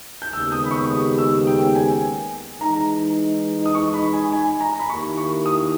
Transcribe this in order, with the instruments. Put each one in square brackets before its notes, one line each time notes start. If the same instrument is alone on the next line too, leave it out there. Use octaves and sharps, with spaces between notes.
[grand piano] G6
[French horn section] D#2 C#3 G#3 B3 G4 [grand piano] E6
[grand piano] D#6
B5
C#6
D#6
E6
G5
G#5
[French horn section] E3 G#3 D#4 [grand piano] A#5
[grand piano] D#6
C#6
B5
G#5
G#5
A#5
B5
[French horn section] D#3 A#3 E4 G4 [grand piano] C#6
[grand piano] C#6
D#6